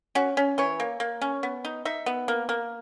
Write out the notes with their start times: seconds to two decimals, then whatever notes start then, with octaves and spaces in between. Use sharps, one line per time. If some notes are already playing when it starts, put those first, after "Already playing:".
0.15 C#4 F#4
0.37 C#4
0.58 E3 C#5
0.80 A#3
1.00 A#3
1.21 C#4
1.43 B3
1.65 D#4
1.85 D#4 E5
2.06 B3
2.28 A#3
2.49 A#3